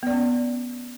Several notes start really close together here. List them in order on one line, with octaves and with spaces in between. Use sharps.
B3 D5 C#4